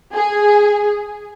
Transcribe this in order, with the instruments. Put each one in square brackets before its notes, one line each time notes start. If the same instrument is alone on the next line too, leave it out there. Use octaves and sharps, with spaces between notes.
[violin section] G#4